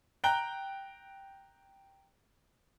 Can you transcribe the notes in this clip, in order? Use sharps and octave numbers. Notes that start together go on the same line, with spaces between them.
G5 A#5 F#6 G7